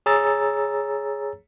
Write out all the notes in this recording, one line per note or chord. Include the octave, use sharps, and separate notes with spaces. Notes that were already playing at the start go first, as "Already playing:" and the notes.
G#4 C#5 A#5 E6 A6